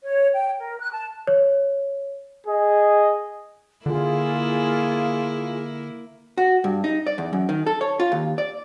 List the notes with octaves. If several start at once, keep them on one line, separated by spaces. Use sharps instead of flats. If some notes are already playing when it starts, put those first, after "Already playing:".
C#5
G5
A#4
F#6
A5
C#5
G#4 D#5
D3 A#3 E4 F4 G#4
F#4
G2
D#4
D5
E2
F#2
D#3
A4
C#5
F4
D#2
D5